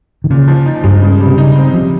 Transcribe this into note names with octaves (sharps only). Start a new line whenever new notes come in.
D#3
A#2 C#3
F3
D#4
G2 G#3
C#3
G3
C3
C#3 D#4
C4
C3 F3